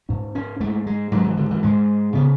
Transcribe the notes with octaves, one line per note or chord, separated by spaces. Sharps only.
G#2 C#4
C#4
G#2 A3
G#3
G#2 F#3
E3
D3
E3
G#2 G#3
C#3 B3